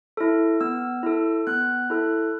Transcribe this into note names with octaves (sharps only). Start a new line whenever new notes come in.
E4 A4
B3 E6
E4 A4
B3 F#6
E4 A4